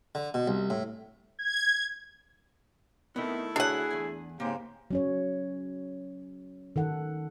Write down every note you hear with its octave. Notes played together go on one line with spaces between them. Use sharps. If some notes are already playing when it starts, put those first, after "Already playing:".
D3
B2
C2
A2
G#6
D#3 A3 B3 C4 E4
D3 D4 F#4 G#4 C#5 F#5
E2 G#5
G#2 C#3 A#3 C4 G4
F#3 C#4 C#5
D#3 A4 F#5